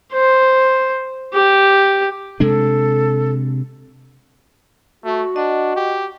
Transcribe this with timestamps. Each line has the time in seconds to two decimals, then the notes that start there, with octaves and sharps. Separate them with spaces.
0.12 C5
1.34 G4
2.40 C3 G#3 D4 A4
5.04 A3 F#4
5.36 D4 D#5 F#5
5.76 G4